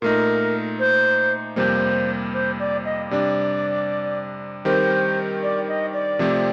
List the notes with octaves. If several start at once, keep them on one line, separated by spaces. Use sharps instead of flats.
A#2 A3 D#4 A#4
C5
F2 C3 G3 A#3 C5
C5
D5
D#5
C3 G3 D4 D5
D#3 G3 C4 G4 A#4 C5
D5
D#5
D5
C3 F3 A3 C4 G4